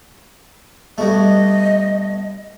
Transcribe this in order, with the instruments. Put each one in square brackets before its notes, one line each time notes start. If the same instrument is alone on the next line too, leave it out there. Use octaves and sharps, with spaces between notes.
[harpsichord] G2 B2 A3 [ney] D#5